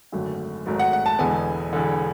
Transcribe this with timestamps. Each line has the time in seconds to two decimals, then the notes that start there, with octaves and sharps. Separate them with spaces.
0.12 G#1 F#2 D3 F#3 A3
0.66 G#1 G#2 F#3 A3
0.79 F#5
0.93 F#5
1.06 A5
1.19 E1 E2 D3 G#3 B3 G#5
1.73 E1 E2 D3